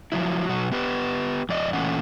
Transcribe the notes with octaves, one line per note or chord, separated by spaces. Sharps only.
F3 F#3 E4
B2 F#3 F#4
B3 G4 B4
F2 D5 D#5
A#2 E3 A3 C#4 F#5